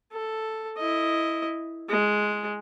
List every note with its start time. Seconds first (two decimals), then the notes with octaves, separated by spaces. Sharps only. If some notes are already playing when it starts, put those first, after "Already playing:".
0.13 A4
0.77 E4 D#5
1.89 G#3